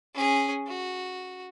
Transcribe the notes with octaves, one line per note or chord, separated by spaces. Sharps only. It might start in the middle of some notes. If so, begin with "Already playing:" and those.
C#4 G#4
F#4